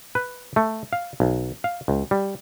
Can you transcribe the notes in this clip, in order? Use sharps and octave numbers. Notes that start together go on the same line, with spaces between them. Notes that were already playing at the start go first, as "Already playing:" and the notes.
B4
A3
F5
B1
F5
C#2
G3